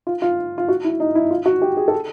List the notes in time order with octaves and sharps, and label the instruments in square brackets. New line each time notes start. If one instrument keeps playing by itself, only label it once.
[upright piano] F4
F4
F4
F#4
E4
D#4
E4
F4
F#4
G4
G#4
A4